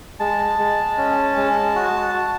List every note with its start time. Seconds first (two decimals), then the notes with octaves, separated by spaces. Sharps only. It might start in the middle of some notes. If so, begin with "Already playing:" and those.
0.20 G#3 A5
0.59 G#3
0.97 C#4
1.37 G#3
1.75 F#4
2.14 F#4